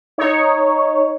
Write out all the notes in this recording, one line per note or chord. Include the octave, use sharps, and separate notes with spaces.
D#4 C#5